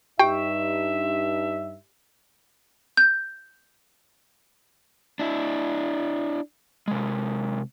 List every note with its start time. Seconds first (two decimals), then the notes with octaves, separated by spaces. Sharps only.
0.19 G2 D#4 G4 E5 G5
2.97 G6
5.19 D4 E4
6.88 C3 G#3